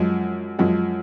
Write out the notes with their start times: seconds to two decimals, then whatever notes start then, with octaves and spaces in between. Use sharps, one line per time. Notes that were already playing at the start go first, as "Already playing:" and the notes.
Already playing: F#2 F3 G#3
0.59 F#2 F3 G#3